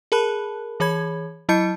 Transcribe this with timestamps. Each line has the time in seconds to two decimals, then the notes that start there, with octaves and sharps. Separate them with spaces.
0.12 G#4 A#4 A5 B5 F#6
0.80 E3 G#4 C#5 B5 G#6
1.49 F#3 E4 D#5 A5 G6 C#7